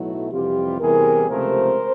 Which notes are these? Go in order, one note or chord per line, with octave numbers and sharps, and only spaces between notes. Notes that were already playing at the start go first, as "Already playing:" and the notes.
Already playing: B1 A2 F#3 A3 E4 F#4
F2 C3 E3 G3 F4 G4
E2 C3 E3 G3 G#4 A#4
C#2 C3 F3 A3 A#4 C5